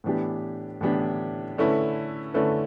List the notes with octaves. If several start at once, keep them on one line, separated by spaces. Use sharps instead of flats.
A2 E3 B3 D4 G4
A2 E3 B3 D4 G4
D3 A3 C#4 E4 B4
D3 A3 C#4 E4 B4